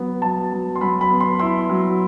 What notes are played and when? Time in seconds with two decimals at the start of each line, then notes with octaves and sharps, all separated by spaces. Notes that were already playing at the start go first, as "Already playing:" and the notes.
Already playing: F#3 B3
0.22 F#3 A5
0.52 F#3
0.76 C6
0.81 F#3 B5
1.01 B5
1.10 B3
1.20 C6
1.39 E4 C6
1.69 F#3